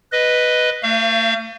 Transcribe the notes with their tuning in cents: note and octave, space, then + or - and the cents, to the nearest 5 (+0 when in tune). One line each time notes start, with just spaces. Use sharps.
B4 +0 D#5 +0
A3 +40 F5 -35